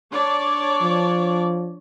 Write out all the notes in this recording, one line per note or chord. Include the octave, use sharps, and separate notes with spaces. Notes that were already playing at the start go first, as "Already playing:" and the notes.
D4 C#5 D5
F3